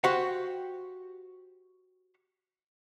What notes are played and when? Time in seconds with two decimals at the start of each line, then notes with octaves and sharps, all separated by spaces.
0.04 F#4 G4 C5 F5 F#5